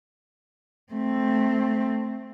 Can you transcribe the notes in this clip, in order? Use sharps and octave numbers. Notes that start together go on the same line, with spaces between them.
A3 C4